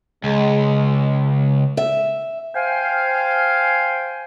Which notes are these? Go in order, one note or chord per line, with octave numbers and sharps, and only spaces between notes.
C#2 G#3
E5
C5 F5 G5 G#5